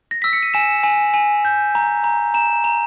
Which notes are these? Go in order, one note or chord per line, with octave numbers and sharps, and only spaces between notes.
A#6
E6 B6
C#7
D#7
G#5 E7
G#5
G#5
G6
A#5
A#5
A#5 E7
A#5